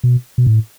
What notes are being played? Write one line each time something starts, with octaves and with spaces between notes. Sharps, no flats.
B2
B2
A2